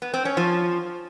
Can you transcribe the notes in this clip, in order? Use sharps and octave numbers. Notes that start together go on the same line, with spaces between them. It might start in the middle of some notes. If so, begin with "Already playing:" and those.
B3
C4
C#4
F3